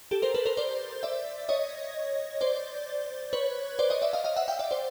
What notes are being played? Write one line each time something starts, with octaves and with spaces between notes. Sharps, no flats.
G4 A4
A#4 C5
A4 B4
A#4 C5
C5 D5
D5 E5
C#5 D#5
C5 D5
B4 C#5
C5 D5
C#5 D#5
D5 E5
D#5 F5
D#5 F5
E5 F#5
F5 G5
D5 E5
C5 D5